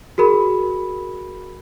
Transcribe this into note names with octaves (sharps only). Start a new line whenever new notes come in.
F#4 G#4 A#4 B5